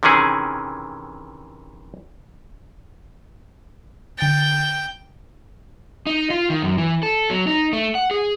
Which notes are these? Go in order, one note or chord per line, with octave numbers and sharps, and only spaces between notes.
C3 D#3 E3 C#4 G#4
D3 G5 A6
D#4
F4
D#3
F#2
E3
A4
F#3
D#4
A3
F#5
G#4